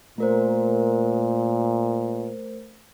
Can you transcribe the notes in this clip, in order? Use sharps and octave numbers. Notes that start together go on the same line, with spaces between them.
A#2 A3 A#4 C5